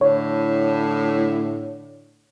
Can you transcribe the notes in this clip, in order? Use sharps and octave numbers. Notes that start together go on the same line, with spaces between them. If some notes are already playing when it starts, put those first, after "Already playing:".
A2 D3 C#5